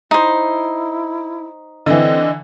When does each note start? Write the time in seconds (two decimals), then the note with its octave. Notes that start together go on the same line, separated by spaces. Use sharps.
0.11 D#4 E4 C5
1.86 D3 E3 C4 D#5